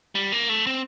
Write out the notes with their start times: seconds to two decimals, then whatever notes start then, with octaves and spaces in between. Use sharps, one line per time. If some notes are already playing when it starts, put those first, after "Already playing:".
0.15 G3
0.32 A#3
0.49 A3
0.67 C4